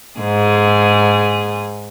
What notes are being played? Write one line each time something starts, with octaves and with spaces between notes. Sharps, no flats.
G#2 G#4